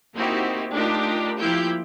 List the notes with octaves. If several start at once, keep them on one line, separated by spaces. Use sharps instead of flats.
A#3 C4 D#4 E4 F#4 G4
A3 D4 D#4 F4 G4 A#4
F3 A#3 E4 F4 G4 G6